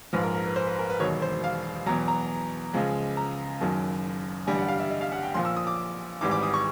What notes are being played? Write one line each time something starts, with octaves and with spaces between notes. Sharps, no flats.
A#1 G#2 F3 B4
A#4
A#4
B4
C5
B4
A#4
B4
E1 D#2 D#3 F#3 C#5
C5
F5
E2 B2 F#3 A#5
A#5
C#2 C#3 F3 G#3
A#5
F#1 F#2 D#3 F#3 A5
A1 G2 D3 G3 G#5
F#5
F5
E5
D#5
F5
F#5
G5
A#1 A#2 F3 C6
E6
D#6
D6
G#1 G#2 E3 G3 D6
D6
D#6
C#6